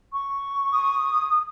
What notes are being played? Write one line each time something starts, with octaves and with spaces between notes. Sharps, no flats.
C#6
D#6